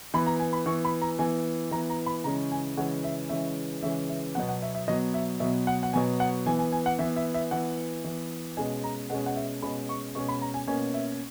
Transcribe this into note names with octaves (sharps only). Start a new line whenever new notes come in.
E3 B3 B5
A#5
G#5
B5
E3 B3 C#6
B5
A#5
E3 B3 G#5
E3 B3 A#5
A#5
B5
C#3 E3 G#3 C#4 A#5
G#5
C#3 E3 G#3 C#4 F#5
E5
C#3 E3 G#3 C#4 E5
C#3 E3 G#3 C#4 E5
E5
B2 F#3 B3 F#5
F#5
E5
E5
B2 F#3 B3 D#5
E5
B2 F#3 B3 E5
F#5
F#5
B2 F#3 B3 G#5
F#5
E3 B3 G#5
G#5
G#5
F#5
E3 B3 E5
E5
E5
E3 B3 F#5
E3 B3
B2 G#3 C#4 G#5
A#5
B2 G#3 C#4 F#5
F#5
E5
B2 G#3 C#4 B5
C#6
B2 G#3 C#4 C#6
B5
A#5
G#5
B2 A#3 C#4 G#5
E5